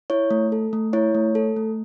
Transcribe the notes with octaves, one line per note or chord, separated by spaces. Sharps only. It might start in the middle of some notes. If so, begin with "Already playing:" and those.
E4 C#5
A3
A4
A3
E4 C#5
A3
A4
A3